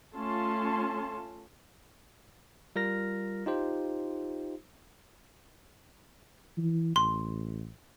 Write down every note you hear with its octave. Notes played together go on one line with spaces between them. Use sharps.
A3 C#4 F4 A5 C6
G3 F4 A#4 F6 A#6
D#4 F4 G4 C5
E3
A1 C6